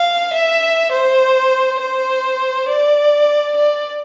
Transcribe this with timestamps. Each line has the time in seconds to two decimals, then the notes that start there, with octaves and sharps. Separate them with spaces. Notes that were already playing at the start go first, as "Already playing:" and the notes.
Already playing: F5
0.33 E5
0.92 C5
1.80 C5
2.69 D5
3.57 D5